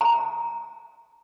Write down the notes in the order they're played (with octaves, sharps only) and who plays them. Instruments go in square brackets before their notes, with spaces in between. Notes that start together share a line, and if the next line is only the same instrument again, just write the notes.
[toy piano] A#5